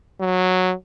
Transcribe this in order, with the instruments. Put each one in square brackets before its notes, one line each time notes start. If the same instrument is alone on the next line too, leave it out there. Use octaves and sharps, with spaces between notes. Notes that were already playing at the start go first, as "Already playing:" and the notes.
[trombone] F#3